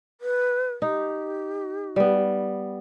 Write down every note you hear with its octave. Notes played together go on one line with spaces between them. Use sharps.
B4
D#4 G4
G3 B3